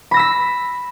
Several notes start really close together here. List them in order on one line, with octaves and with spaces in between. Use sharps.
B5 A#6 E6 B6